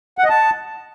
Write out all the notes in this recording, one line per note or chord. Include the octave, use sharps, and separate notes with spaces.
F#5
D#5
A5